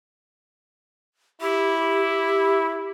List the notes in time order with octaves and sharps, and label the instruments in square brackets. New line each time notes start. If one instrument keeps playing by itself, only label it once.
[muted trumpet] E4 [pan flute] G4